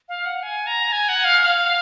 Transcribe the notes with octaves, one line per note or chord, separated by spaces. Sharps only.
F5
F#5
G#5
A#5
G#5
F#5
F5
F5